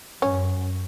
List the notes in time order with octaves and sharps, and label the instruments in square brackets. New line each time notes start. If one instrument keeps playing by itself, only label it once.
[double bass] F#2 [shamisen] C#4